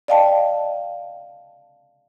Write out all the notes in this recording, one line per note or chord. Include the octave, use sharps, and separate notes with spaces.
D5 D#5 F5 G5 A5